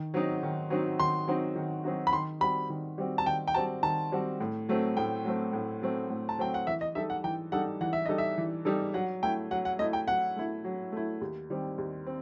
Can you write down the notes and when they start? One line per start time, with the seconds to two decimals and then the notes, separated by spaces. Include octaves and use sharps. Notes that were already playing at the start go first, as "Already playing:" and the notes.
Already playing: D#3
0.14 F#3 C4 D#4 F#4
0.43 D#3
0.70 F#3 C4 D#4 F#4
1.00 D#3 C6
1.28 F#3 C4 D#4 F#4
1.56 D#3
1.84 F#3 C4 D#4 F#4
2.07 B5
2.13 D#3 C6
2.41 G3 C4 F#4 B5
2.70 D#3
2.98 G3 C4 F#4
3.18 A5
3.26 D#3 G5
3.48 G5
3.54 G3 C4 F#4 A5
3.83 D#3 A5
4.12 G3 C4 F#4
4.40 A2
4.69 F#3 A3 C4
4.97 A2 G5
5.24 F#3 A3 C4
5.53 A2
5.82 F#3 A3 C4
6.10 A2
6.29 A5
6.38 F#3 A3 C4 G5
6.54 F#5
6.67 E3 E5
6.81 D#5
6.95 G3 D#4 A4 E5
7.10 F#5
7.24 E3 G5
7.52 G3 D#4 A4 F#5
7.81 E3 F#5
7.93 E5
8.06 G3 D#4 A4 D#5
8.18 E5
8.38 E3
8.65 G3 D#4 A4
8.94 F#3 F#5
9.23 A3 E4 G5
9.51 F#3 F#5
9.65 F#5
9.79 A3 E4 D#5
9.93 G5
10.08 F#3 F#5
10.36 A3 E4
10.64 F#3
10.92 A3 E4
11.21 D#2
11.50 D#3 G3 C4
11.78 D#2
12.07 C4